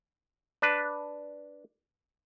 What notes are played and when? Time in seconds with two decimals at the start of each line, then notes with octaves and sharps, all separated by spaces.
0.62 D4 B4